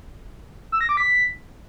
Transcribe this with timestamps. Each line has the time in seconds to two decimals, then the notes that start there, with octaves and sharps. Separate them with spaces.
0.72 E6
0.81 A#6
0.89 D6
0.97 B6